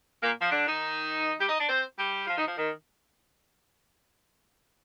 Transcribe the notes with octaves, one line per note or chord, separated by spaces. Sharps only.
A#2 A#3
F3
D3 D4
D#3 D#4
G3 G4
D#4 D#5
D4 D5
C4 C5
G3 G4
F3 F4
D#3 D#4
F3
D#3